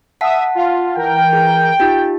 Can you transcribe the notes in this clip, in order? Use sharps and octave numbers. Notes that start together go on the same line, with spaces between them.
E5 F#5 A5 D#6 B6
F4
E3 A#4 G5
G#4
D#4 F4 G4